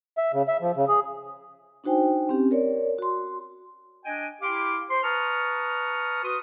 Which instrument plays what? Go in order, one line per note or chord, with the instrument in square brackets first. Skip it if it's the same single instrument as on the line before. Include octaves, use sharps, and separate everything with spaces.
[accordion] E5
C#3
E5
F3
C#3
G#4
[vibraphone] D4 D#4 F#4 C5 G5 G#5
C4 C#4 G4
A#4 C#5 D5
F#4 C6
[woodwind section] D4 D#5 G5 G#5
E4 G4 F5 G5 C6 D6
C5 C6
B4 A5 A#5 C#6 D#6 F6
F#4 B4 C6 D#6